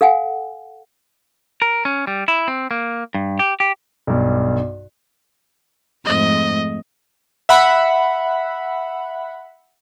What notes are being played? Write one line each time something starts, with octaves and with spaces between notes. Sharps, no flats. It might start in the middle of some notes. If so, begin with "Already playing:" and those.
A4 F5 F#5 G#5
A#4
C#4
G3
E4
C4
A#3
G2
G4
G4
B1 G2
F2 G#2 A3 D#5
E5 F#5 B5